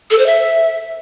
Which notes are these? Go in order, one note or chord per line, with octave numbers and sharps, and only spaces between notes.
A4
C5
E5